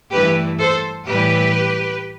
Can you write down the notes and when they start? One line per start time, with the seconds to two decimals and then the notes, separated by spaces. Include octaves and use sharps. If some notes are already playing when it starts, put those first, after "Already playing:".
0.11 G2 E3 A3 G4 B4
0.59 A4 C5
1.06 A2 E3 G3 G4 B4